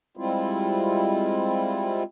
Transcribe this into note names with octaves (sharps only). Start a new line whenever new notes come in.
G3 G#3 C4 E4 F4